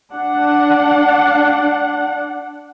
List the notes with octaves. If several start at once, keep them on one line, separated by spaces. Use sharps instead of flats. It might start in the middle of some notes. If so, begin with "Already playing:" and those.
D4 F#5